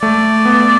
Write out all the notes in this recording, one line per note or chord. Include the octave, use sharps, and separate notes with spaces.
A3 D5
B3